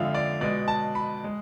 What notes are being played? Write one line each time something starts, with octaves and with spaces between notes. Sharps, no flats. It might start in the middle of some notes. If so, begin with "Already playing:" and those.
Already playing: F2 D3 F3 G#3 E5 F5
D5
B2 G#3 D5
A5
B5
G#3